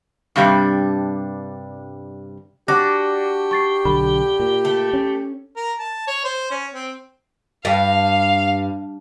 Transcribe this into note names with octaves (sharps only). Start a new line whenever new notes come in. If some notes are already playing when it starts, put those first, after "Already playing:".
G2 C3 G3 D4
D4 F#4 G4 D6 F#6 A#6
C#6 A6 C7
B1 D3 B5
A#2
A3
C#4
A#4
A5
C#5
C5
C#4
C4
G2 F5